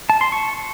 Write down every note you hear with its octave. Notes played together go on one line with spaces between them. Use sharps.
A5
C6
C#6